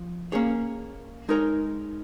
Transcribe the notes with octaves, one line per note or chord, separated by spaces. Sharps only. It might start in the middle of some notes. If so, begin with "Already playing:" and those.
Already playing: F3
A#3 C#4 G#4 C#5
G#3 D#4 A#4 C#5